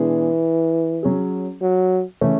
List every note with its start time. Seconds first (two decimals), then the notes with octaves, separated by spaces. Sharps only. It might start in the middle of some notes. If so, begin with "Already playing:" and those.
Already playing: B2 E3 G#3 D4 G#4
1.03 F#3 C#4 G#4
1.62 F#3
2.21 C#3 E3 A3 C#4